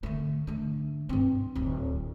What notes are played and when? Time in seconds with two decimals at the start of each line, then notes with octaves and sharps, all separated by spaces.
0.03 D3 A3
0.47 D3 A3
1.09 G2 C4
1.56 D1